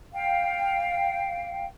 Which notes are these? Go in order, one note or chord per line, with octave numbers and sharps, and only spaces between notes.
F5 G5